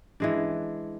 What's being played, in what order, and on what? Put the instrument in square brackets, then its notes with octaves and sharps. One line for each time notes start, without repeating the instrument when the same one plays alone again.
[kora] E3 G#3 D4